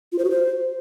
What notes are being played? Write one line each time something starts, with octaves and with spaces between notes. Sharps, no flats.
F4
C5
F#4
C5